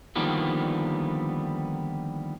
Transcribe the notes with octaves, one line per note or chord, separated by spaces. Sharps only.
D3 D#3 F3 G3 A#3 B3